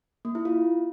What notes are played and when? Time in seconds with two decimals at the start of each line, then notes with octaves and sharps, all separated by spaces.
0.25 A#3
0.35 E4
0.45 F4